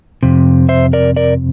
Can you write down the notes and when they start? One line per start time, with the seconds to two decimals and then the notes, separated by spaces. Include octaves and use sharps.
0.23 F2 C3
0.69 C5 E5
0.93 A#4 D5
1.16 A#4 D5